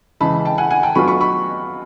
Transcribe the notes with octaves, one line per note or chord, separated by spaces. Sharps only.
C#3 E3 G#3 A5 B5
G5 A5
F#5 G#5
F#5 G#5
G5 A5
F#3 B3 D4 F4 B5 C#6
B5 C#6
B5 C#6